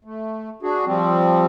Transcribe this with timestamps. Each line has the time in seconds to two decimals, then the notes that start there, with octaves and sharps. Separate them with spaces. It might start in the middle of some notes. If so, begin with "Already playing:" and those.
0.05 A3
0.63 D4 F#4 G#4
0.86 F3 G3 C4